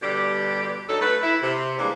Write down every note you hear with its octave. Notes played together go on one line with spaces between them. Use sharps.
B2 D3 G3 D4 G4
D2 F#3 D#4 A4
A3 B4
E4
C3
E3 G3 G#3 A#3 D4